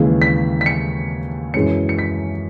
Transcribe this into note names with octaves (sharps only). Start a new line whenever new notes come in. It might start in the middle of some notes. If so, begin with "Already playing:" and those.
Already playing: D#2 C#3 E3 G#3
B6
B6
C#7
F#2 E3 G#3 C#4 C#7
C#7
B6